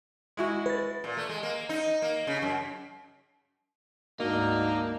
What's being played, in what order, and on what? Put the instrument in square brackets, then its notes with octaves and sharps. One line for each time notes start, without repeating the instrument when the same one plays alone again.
[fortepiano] G#3 E4 F#4
[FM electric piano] B4 A6
[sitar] A#2
A3
G#3
A#3
D#4
A#3
C#3
F#2
[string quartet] D2 G#2 D4 [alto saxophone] A#3 [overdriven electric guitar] D#4 [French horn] F#4